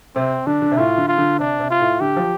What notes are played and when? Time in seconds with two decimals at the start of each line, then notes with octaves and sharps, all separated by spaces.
0.15 C3 C4
0.47 D3 D4
0.62 D3
0.71 C3
0.78 A2 F4
0.98 D3
1.08 F4
1.18 D3
1.39 C3 D4
1.59 C3
1.70 F4
1.80 A2
2.01 D3 G4
2.16 F3